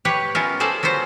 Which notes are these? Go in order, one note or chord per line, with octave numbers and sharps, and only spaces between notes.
G4 B4 C#5
B3 C#4 E4 F4 A#4
G#4 A4 C5 D5 F5
F#3 B3 F4 C5